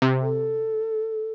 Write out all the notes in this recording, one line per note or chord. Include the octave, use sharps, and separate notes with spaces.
C3
A4